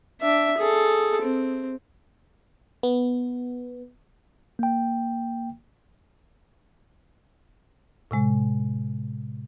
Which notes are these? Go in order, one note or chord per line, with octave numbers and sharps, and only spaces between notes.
D4 E5
G#4 A4
C4
B3
A#3 G5
A2 C3 G#3